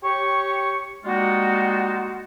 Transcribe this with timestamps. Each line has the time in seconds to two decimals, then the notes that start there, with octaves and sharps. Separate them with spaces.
0.03 G4 C#5 C#6
1.05 G3 G#3 A#3 D#4 F4 F#4